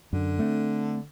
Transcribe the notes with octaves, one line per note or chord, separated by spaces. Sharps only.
F#2 D3
A3 C4